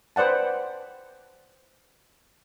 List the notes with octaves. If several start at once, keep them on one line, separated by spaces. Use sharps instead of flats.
B4 C5 D5 F#5 A5